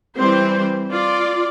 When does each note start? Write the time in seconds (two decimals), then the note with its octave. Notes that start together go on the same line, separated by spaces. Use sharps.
0.15 E3 G3 C4 C5
0.90 F4 D5